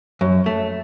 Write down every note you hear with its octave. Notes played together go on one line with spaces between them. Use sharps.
F#2
A3